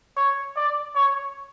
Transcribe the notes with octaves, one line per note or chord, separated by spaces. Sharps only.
C#5
D5
C#5